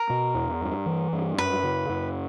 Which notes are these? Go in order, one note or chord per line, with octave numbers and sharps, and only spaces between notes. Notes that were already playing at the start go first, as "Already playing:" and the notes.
Already playing: A#4
B2
E2
G2
E3
G2
F#2 B4
C#3
F#2